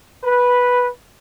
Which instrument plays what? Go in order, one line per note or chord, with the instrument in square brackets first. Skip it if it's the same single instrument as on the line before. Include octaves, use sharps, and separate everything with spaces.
[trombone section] B4